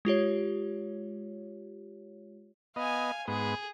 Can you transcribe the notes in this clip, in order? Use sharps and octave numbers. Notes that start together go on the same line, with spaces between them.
G#3 F4 G4 C#5
B3 D#5 F5 G#5
G#2 B3 G#4